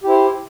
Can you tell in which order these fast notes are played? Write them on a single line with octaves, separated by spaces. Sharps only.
G4 E4 C5